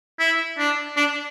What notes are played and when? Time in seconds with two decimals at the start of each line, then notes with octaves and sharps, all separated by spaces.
0.19 E4
0.58 D4
0.96 D4